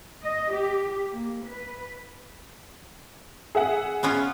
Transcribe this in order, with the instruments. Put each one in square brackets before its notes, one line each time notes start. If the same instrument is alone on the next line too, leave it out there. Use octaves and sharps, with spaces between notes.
[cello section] D#5
G4
A#3
B4
[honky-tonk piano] G#4 E5 F#5
[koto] B3 C#4 F4